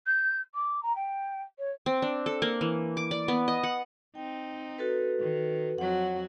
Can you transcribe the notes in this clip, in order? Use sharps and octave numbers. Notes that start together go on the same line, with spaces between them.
G6
D6
A#5
G5
C#5
C4
D4
A4
A#3
E3
D6
D5
B3
D#5
F#5
C4 D#4 G5
F#4 A4 B4
D#3
F2 F#3 F#4 C#5 F#5